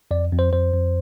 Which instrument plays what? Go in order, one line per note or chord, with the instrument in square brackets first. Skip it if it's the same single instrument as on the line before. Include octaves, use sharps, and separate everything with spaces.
[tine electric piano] F2 D5
F2
C5
F2 C5
F2